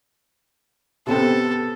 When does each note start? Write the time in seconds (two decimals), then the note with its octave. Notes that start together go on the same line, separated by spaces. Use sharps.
1.07 C3 B3 C4 A4